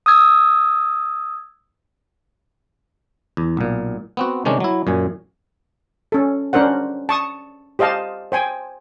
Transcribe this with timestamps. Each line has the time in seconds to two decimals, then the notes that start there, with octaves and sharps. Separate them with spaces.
0.06 D#6 E6 G#6
3.37 E2
3.57 B1 A#2
4.17 B3 C4 F#4
4.45 C3 D#3 G#3 C#4 D4
4.60 F#3 E4
4.87 F#2 A#2 G#5
6.12 C#4 A4
6.53 C#4 D4 A#4 C5 F#5
7.09 A5 C#6 D#6
7.79 G4 C5 D#5 F5 A5
8.32 C5 G5 G#5